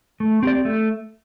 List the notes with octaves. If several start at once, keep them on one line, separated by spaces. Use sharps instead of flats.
A3
C4 G4 D5
A3